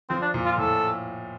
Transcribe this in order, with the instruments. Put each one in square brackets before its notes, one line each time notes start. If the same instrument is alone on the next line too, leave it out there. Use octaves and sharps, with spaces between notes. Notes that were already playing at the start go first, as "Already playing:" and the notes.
[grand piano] F3 [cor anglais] C4
[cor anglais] D4
[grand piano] A#2
[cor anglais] F4
[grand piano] A2 [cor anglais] A4